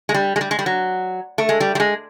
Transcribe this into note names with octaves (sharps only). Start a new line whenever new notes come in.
G#3
G3
G#3
G3
G#3
G3
F#3
A3
G#3
G3
G3
G#3